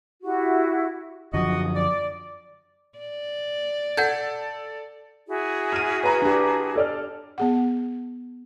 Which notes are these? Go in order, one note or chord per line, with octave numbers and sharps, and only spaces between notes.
E4 F#4 G4
F#2 D3 F3 F#4 D#5
D5
D5
A4 F#5 G6 G#6
E4 F#4 G#4
F6 D#7
B4 A#5
D4 G4
A4 D5 F6
B3 G#4 F#5